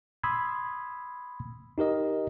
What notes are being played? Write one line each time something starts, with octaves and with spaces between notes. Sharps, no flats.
B5 C6 D#6 E6 G#6
D#4 G4 A#4 D#5